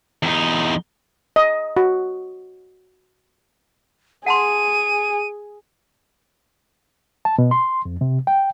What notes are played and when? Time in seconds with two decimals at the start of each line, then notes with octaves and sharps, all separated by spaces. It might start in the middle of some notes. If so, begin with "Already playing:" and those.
0.23 E2 D#4
1.36 D#5
1.77 F#4
4.26 G#4 F#5 A5 C6 D#7
7.25 A5
7.38 B2
7.51 C6
7.85 F2
8.01 C3
8.27 G5